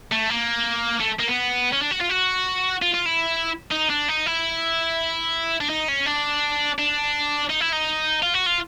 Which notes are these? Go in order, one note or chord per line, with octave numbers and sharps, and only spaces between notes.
A3
A#3
A3
A#3
B3
C#4
D4
F#4
F4
F#4
F4
F4
E4
D#4
D4
D#4
E4
D4
D#4
C#4
D4
D4
D#4
E4
D#4
F4
F#4
F4